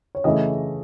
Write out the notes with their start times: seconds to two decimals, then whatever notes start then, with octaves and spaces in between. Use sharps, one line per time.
0.15 C#5
0.24 C#3 E3 A3 D#5